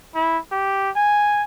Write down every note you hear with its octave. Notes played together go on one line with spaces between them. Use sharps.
E4
G4
G#5